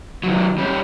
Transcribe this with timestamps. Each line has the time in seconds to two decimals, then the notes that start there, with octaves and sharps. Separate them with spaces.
0.23 D#3 F#3
0.58 G3 C#4 G4